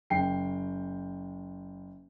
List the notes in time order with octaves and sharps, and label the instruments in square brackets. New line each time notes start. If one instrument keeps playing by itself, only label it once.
[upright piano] F#1 G5 C7